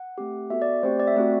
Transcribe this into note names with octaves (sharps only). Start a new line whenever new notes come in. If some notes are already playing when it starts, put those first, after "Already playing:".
Already playing: F#5
A3 C4 G4
B3 F#4 A4 E5
D5
A3 C4 G4 C5
D5
E5
A3 C4 F#4 D5